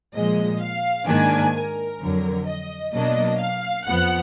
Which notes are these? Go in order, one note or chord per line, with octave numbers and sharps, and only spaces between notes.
A#2 F3 G#3 D#5
F5
G#2 D#3 A#3 D4 G#5
A#4
F2 D3 F#3
D#5
B2 F#3 A#3 D4 D#5
F5
F2 F3 B3 F#5